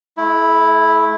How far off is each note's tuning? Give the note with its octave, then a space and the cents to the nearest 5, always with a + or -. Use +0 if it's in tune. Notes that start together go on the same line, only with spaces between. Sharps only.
A3 -45 E4 -5